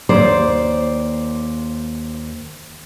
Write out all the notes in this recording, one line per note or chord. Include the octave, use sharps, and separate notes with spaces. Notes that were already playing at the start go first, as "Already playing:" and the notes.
D#2 C5 D5